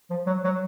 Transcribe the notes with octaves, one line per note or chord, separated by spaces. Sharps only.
F3
F#3
F#3